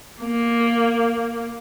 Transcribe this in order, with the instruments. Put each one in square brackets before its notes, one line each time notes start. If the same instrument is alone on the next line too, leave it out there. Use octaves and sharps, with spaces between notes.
[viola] A#3